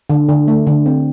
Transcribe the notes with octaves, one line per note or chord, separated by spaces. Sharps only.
D3
D3
A3
D3
C4